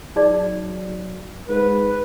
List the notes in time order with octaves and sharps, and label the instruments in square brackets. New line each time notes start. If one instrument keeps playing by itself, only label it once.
[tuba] F#3 [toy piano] D#4 G#4 D5
[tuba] G#2 [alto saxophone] B4